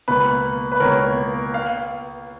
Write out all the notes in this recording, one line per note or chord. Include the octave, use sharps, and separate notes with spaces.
C#2 B2 A#3 B4
B4
C#2 B2 A#3 A#4 C#5
F5